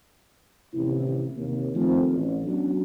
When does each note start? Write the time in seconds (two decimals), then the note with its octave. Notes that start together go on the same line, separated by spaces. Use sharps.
0.73 A1 D#2 C3 E4
1.35 D#2 C3 A#3
1.73 D#3 F3 A3 C4
2.12 A1
2.43 F#3 B3 C#4 D4